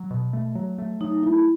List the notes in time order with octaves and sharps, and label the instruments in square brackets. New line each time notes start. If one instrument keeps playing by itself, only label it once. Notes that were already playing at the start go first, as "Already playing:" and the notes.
Already playing: [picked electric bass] F#3
B2
A3
F#3
A3
[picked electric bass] F#3 [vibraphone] D#4
[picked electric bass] A3 [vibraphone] E4